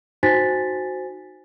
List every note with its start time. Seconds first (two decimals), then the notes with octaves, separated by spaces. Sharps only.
0.23 D#4 F#4 C5 G#5 A6 B6